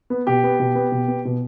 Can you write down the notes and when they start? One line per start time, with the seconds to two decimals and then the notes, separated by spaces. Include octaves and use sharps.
0.10 B3
0.27 B2 G4
0.44 B3
0.59 B2
0.75 B3
0.92 B2
1.08 B3
1.25 B2